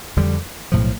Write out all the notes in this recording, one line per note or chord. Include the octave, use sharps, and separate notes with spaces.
F2 D3 G3
B1 A2 F3